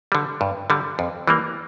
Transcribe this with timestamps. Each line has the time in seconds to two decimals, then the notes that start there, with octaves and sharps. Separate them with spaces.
0.12 D3 G3
0.41 G2
0.70 D3 G3
0.99 F2
1.27 E3 G3 A#3